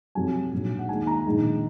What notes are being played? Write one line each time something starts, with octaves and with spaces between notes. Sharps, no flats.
F2 C3 F#3 G#5
A#1 G#2 F#3
F#5
D#2 D#3 G#3 G#5
A#5
A#1 G#2 D#3 G#3